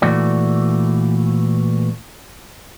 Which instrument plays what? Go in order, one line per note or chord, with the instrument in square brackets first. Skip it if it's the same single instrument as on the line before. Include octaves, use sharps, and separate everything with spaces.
[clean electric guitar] A#2 E3 A3 F#4 D5